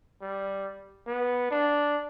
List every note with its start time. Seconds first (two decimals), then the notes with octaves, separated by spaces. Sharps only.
0.21 G3
1.07 B3
1.51 D4